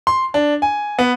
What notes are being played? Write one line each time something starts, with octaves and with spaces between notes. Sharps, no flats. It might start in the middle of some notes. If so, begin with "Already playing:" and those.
C6
D4
G#5
B3